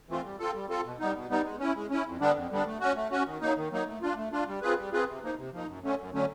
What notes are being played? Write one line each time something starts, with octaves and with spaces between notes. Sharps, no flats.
E3 A3 C4 F4
G3
C4 F4 A4
G3
C4 F4 A4
B2
G3 B3 D#4
B2
G3 B3 D#4
G#3
C#4 E4
G#3
C#4 E4
F2
D3 G3 B3 D4
F2
D3 G3 B3 D4
A3
C#4 F#4
A3
C#4 F#4
D#3
F#3 A#3 D#4
D#3
F#3 A#3 D#4
A3
D4 F4
A3
D4 F4
G3
C4 F4 G#4 B4
G3
C4 F4 G#4 B4
C3
F3 A#3 D#4
C3
F3 A#3 D#4
F#2
D3 F#3 A3 C#4
F#2
D3 F#3 A3 C#4